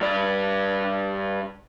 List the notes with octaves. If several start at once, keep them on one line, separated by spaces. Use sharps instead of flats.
G2 D5